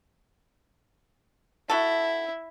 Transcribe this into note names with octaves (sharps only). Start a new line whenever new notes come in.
E4 F#4 A4